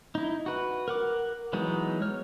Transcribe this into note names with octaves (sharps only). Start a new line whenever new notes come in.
D#4 E4
F#4 B4
A#4 F#5 D6
E3 F#3 G#3 B3 D#4
C#5 F6